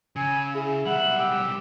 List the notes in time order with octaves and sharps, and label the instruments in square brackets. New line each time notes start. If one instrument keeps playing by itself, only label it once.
[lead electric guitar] C#3 [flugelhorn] G#5 [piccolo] E6
[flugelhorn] E4 [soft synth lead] G#4
[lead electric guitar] B1 G3 [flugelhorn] E5 [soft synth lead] F#5 [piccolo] F#7
[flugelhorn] G4 [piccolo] E6